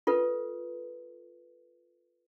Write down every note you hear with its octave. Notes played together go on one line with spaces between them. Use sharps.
F4 A4 B4